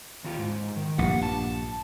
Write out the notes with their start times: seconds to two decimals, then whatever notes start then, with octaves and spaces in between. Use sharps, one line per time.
0.24 D#2 F4
0.39 G#2
0.76 D#3
0.98 A#1 G2 F#5
1.23 A5